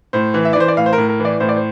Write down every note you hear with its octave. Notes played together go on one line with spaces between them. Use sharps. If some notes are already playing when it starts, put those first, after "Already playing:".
A2 C5
E3
E5
D5
E3 C5
D5
A2 F5
C5
A#4
A2
A#4
E3
D5
A2 C5
D5
C5